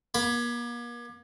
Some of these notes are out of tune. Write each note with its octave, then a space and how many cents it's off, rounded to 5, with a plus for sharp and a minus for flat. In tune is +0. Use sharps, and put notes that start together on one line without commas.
A#3 +40 B5 +0